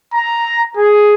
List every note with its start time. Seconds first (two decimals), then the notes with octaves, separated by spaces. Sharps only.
0.14 A#5
0.77 G#4